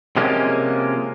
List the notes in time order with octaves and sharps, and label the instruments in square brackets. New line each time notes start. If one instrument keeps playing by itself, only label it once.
[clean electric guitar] C3 F3 G#3 A#3 C#4